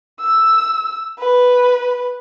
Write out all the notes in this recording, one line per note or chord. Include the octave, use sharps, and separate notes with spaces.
E6
B4